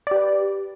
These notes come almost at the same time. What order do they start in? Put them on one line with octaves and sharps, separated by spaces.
D5 G4 B4